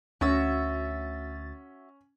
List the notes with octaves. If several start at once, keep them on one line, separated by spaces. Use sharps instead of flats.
D2 C#4 F#4 E5 A6